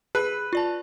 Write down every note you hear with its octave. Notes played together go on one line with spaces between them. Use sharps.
G#4 B4
F4 D5 A5